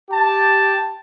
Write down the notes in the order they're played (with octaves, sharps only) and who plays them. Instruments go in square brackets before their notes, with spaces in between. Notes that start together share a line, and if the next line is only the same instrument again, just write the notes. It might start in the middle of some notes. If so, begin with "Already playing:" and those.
[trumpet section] G4 A5